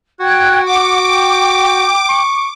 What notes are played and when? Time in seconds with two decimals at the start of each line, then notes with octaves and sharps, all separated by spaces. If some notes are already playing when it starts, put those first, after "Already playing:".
0.20 F#4 G5 F#6 G#6
0.65 F#5 D6
1.07 G5
2.09 C#6